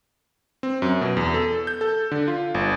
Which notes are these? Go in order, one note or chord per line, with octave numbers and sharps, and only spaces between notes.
C4
F#2
B2
E2
A4
G6
A4
D3
F4
G1